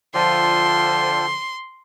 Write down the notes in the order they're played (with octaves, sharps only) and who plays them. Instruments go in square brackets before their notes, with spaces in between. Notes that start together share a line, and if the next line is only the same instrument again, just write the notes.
[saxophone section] D3 F3 [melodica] F4 A4 G5 [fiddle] C6